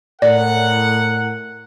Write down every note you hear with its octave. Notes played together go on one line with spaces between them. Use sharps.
A2 A#4 D5 F#5